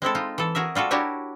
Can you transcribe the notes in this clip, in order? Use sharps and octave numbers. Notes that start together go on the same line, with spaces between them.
G#3 C4 E4 A4
D#4 F4
E3 A4
F#4 G#4 A#4 E5
G3 F4 F#4 A4
D4 E4 F#4 G4 A#4 C#5